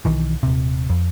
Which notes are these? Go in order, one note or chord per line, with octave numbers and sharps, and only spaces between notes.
B1 D#3 E3
D#1 C3
F2